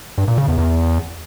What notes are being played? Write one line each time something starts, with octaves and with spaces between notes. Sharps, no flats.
G2
A#2
C#3
E2
E2